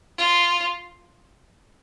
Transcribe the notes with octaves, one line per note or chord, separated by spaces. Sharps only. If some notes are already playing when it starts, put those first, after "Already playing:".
F4